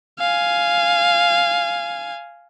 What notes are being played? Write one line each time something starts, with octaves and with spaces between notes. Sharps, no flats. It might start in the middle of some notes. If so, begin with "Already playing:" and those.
F5 G#5